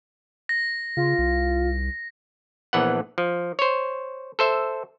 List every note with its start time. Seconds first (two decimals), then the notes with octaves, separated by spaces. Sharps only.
0.49 A#6
0.97 C#3 F4
1.18 C2
2.73 A#1 E3 B3 F#5
3.18 F3
3.59 C5 C#5
4.39 A4 C5 E5